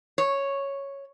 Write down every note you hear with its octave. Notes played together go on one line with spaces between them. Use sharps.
C#5